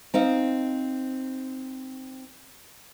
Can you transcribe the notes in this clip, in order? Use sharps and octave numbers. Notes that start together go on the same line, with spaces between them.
C4 D#4 F5